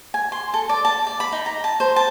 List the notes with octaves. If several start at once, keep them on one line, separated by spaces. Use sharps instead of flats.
G#5
C6
A4
D5
A5
D5
B5
D#4
A#5
A5
C5
A5